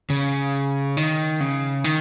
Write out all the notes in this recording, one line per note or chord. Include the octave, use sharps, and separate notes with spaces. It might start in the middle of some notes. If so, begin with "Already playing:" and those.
C#3
D#3
C#3
D#3